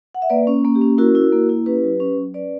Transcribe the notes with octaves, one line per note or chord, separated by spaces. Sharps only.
F#5
E5
A#3 B4 D5
C#4
A#3
G4
C#4
E4 F#4 A#4
E4
A#3
E4
C#4 G4 B4
F#3
C#4
F#3
C#4 B4 D5